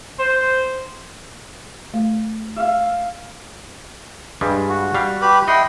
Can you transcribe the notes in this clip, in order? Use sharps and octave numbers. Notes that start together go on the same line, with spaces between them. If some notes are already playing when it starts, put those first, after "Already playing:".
C5
A3
E5 F5
G2 G3 G#3
F#4
G3 F5
G4 B4 B5
E4 D#5 F#5 G5 C6